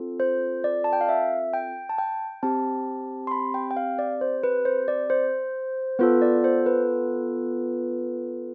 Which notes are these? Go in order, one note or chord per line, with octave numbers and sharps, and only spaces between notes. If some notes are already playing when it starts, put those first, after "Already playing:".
Already playing: C4 F4 A4
C5
D5
A5
G5
F5
E5
G5
A5
G5
C4 G4 A5
C6
B5
G5
G5
F5
D5
C5
B4
C5
D5
C5
B3 F4 A4 B4
D5
C5
B4